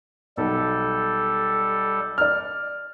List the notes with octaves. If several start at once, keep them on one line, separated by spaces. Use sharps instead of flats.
B1 G3 A4
D5 F6